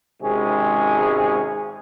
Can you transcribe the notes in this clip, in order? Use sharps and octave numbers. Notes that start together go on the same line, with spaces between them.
G#1 C3 G#3 C#4 G#4